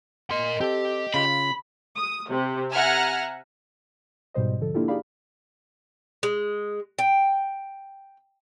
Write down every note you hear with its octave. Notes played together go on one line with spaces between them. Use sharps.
A#4 D#5 C6
C4 G4 A4
C#3 F4 B5
D#6
C3
E5 F#5 G#5 A#5 F6
G#2 B2 G3 C5 D#5
D3 F3 A4
A#3 D4 E4 F4 G4 A4
D#4 G4 G#4 D5 F5 B5
G#3
G5